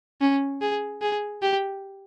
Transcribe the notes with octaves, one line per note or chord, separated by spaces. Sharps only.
C#4
G#4
G#4
G4